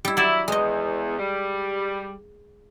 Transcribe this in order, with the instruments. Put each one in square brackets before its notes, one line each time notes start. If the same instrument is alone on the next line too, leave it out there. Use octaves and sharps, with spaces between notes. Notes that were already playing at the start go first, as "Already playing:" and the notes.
[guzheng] G3 E4
[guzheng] F#3 D5 [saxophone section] E4
[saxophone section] E2 [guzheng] G#3 D#5
[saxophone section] G3